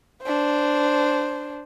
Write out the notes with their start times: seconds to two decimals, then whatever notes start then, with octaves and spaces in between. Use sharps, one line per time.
0.23 D4 C5